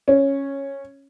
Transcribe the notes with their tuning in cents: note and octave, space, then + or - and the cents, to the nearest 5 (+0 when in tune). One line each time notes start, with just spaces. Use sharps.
C#4 -10